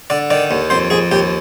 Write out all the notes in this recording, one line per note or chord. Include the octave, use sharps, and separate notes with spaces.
D3 D5
D#3 D5
D#2
F2 C5
F2 G#4
D#2 G4